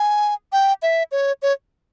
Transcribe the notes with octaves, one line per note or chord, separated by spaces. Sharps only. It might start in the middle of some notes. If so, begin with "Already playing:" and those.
Already playing: G#5
G5
E5
C#5
C#5